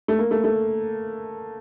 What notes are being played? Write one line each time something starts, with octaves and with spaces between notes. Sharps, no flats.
A3
A#3
A3
A3